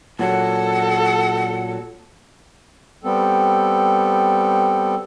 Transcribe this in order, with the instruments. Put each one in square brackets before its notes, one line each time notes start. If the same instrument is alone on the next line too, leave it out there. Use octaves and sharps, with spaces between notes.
[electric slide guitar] A#2 F#3 [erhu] A4 [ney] F#5
[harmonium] G3 B3 C4 A4